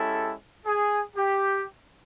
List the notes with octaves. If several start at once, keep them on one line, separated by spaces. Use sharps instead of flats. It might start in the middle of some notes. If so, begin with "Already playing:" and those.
Already playing: G#3 C#4 E4 G4 A4
G#4
G4